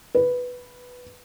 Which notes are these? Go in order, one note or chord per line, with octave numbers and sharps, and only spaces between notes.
B4